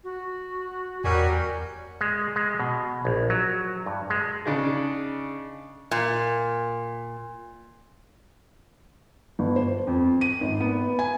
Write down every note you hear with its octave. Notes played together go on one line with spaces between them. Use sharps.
F#4
E2 F#3 G3 F#4 A#4 G#5
G#3
G#3
B2
A#1
F#3
G2
G#3
C#3 D4 D#4 G#4
A#2
G1
C5
F2
D#7
G#1
B3
G#5